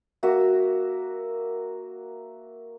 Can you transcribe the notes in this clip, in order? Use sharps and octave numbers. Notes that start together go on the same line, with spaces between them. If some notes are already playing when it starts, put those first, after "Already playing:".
A#3 F#4 A#4 E5